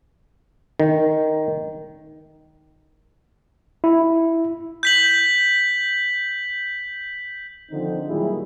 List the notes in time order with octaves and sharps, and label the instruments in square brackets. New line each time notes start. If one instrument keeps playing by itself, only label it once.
[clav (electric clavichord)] D#3
[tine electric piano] E4
[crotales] G6 B6 F#7
[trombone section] D3 D#3 F3 C4 D#4
A#2 D#3 F#3 G3 E4 G#4